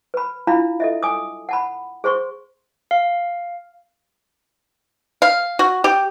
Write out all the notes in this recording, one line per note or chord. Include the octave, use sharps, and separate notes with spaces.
B4 B5
D4 E4 F4 F5 A#5 B5
A4 D#5 E5
G#5 D6 D#6
F#5 A5 B5
G#4 C5 C6 C#6
F5
F5
F#4
G4